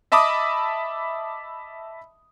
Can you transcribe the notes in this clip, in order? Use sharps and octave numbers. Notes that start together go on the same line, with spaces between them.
D#5 E5 A5 B5 D6 D#6